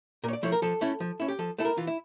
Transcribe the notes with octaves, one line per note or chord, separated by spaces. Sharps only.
A#2 A#4 C#5
D5
F3 A3 E4 C#5
A#4
F3 A4
A3 C#4 E4
F3
C#4 E4
G4
F3 A4
A3 E4 A4
A#4
E3 F4
E4